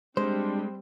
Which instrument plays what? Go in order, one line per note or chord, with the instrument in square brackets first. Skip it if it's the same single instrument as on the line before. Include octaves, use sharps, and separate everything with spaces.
[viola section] G3 C4 [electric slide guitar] G#3 [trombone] D4 [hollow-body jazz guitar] C5